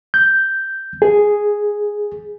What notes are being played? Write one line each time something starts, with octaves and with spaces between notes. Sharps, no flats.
G6
G#4